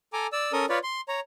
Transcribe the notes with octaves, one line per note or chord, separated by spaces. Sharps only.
A4 G#5 A#5 D6
D5 E6
C#4 A4 A#4 D#6
F4 B4 C#5 D5
C6
C#5 A#5